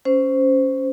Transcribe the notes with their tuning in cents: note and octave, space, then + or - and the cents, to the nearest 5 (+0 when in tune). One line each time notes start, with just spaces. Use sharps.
C#4 +5 C5 -10